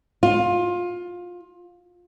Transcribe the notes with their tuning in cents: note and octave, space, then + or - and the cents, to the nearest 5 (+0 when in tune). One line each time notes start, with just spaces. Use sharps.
F4 +20